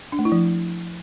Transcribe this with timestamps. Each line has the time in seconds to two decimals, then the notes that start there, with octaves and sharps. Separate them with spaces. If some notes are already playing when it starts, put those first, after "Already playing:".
0.12 D4
0.19 A3
0.25 E4
0.32 F3